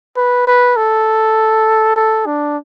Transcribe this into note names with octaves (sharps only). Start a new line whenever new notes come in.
B4
B4
A4
A4
D4